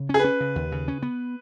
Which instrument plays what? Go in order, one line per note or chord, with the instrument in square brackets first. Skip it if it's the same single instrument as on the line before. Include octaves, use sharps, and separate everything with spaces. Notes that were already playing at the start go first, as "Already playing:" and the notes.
Already playing: [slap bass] C#3
[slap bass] C#4 [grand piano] G#4
[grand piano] B4
[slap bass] C#4
C#3
D#2
C#3
C#4
B3